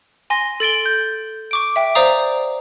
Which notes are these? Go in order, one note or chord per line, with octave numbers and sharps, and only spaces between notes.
G#5 C6 A#6
A4 A6 D7 G7
G6
C#6 D6 D7
E5 G5
C5 D5 F5 A#5 D#6